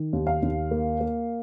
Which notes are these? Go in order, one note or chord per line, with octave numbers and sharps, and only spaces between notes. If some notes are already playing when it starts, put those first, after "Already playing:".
Already playing: D#3
D#2
F5
D#2
A#3
A#3